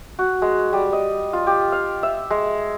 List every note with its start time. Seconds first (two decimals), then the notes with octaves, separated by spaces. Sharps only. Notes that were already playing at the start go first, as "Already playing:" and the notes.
0.19 F#4
0.42 G#3
0.73 G3
0.93 D#5
1.33 F4
1.47 G4
1.72 F5
2.03 E5
2.30 G#3